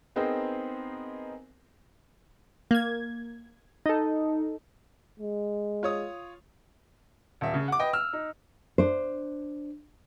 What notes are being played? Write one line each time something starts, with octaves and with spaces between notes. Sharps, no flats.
B3 C4 D#4 G#4 A#4 C5
A#3 G#6
D#4 A4
G#3
F4 C#5 D#6
D#1 E5
C#3
F#5 D6
B4 D#5 G5
E6 F6
D#4
D4 C5